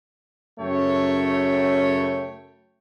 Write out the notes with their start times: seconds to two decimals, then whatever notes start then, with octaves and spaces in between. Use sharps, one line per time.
0.60 F#2 C#3 A3 C#5 G5